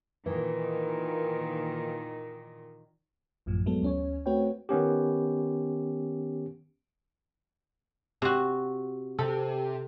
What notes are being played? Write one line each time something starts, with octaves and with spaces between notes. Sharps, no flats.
A#2 D#3 E3
A1 F#2 A2 F3
F#3 G#3 B3 A4
D2 C#4 C#5
A3 C4 F#4 B4 C#5 G5
D#3 B3 C#4 G4
C3 F#4
C3 A4